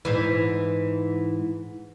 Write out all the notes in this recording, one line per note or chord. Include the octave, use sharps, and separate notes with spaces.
G#2 E3